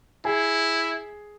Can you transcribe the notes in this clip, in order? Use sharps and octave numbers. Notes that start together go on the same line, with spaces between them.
E4 G#4